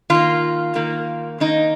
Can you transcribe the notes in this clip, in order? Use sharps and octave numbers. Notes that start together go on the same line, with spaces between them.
D#3 A#3 F4
D#3 A#3
D#3 A#3 D#4